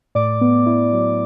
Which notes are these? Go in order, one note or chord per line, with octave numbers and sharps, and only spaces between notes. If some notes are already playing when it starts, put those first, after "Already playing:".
A2 D5 D6
B3
E4
F#3